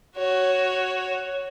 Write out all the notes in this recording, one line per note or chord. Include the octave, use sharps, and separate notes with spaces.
F#4 C#5